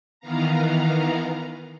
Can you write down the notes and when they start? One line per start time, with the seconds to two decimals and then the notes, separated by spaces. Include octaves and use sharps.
0.20 D#3 E3 B3 F5 A#5